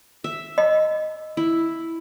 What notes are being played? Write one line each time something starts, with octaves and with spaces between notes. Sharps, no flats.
E5
D#5
E4